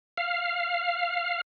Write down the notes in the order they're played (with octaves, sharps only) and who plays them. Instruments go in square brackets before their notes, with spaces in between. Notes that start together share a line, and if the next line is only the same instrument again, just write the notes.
[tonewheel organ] F5